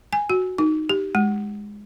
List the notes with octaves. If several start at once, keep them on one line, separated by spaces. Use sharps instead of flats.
G#5
F#4
D#4
G4
G#3